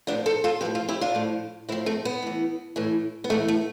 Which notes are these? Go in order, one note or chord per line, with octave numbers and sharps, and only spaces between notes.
A2 F3 B3 D4
A4 C5
F4 A4
A2 F3 G4 B4
F4 A4
E4 G4
D4 F4
A2 F3
A2 F3 C4 E4
A3 C4
B3
A2 E3
A2 E3
B3
A2 E3 A3
A3